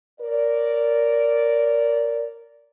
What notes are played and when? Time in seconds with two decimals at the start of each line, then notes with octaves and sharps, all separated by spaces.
0.20 A#4 C#5 D5